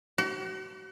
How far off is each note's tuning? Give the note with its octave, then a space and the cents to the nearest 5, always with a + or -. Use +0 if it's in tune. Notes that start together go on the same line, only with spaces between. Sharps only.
F#4 +40